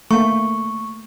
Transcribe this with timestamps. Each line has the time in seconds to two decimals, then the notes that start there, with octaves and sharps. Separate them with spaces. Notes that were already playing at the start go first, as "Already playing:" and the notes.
0.11 A3 A#3 C#6